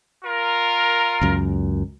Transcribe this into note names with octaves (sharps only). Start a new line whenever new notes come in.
F4 A#4
C#2 F#2